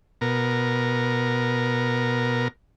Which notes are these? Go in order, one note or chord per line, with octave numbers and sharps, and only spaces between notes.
B2 A#4